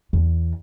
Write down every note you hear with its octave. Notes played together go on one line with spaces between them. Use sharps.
E2